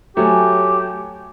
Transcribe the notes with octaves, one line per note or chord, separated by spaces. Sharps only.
F#3 A3 G4 C#5 G#5 A5